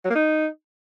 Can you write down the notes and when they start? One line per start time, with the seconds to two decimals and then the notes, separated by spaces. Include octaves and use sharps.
0.05 F#3
0.10 A#3
0.15 D#4